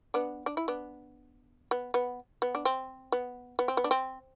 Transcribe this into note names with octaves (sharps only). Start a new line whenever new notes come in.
B3 D4
D4
E4
B3 D4
B3
B3
B3
D4
C4
B3
B3
C4
B3
D4
C4